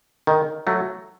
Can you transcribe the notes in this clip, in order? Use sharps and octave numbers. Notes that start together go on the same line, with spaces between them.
D#3
F#3 A3